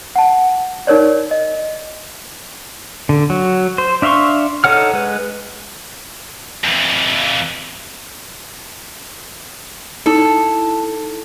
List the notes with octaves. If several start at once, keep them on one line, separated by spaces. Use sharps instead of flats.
F#5 A5
D#4 A#4 C#5 D5
D#5
D3
F#3
C5
D4 E5 F5 C6 C#6
D#4 A4 C#5 F#5 F6
G#3 B4
F2 E3
D#4 E4 A4